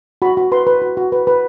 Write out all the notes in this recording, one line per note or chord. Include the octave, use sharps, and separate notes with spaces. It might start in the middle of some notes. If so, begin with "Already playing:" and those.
F#4 B5
F#4
B4 C6
B4
F#4
F#4
B4
B4